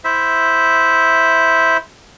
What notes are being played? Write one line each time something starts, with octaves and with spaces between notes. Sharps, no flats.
E4 C5 E5